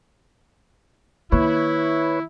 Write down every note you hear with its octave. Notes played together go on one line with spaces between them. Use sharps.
D#3 A#3 E4 B4 C#5